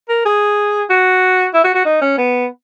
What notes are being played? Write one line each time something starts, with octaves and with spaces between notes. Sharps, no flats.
A#4
G#4
F#4
E4
F#4
F#4
D#4
C#4
B3